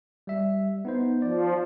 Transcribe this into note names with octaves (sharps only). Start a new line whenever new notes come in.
G3 E5
B3 D#4 C5
F3 D5